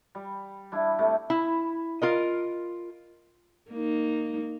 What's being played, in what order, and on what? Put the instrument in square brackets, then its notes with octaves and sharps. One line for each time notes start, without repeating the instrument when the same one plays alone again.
[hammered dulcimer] G3
G3 D4 E4
C3 A3
[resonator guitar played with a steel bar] E4
F4 A#4 D#5
[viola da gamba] A#3 D#4